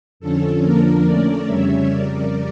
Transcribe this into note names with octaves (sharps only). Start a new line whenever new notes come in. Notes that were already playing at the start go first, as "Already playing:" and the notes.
F2 D3 F3 C#4 A4
F2 D3 F3 A#3 D4 A#4
D3 A3 C#4 A#4 D5
F2 C#3 G3 C#4 C#5 E5
F2 C#3 G3 A#4 D5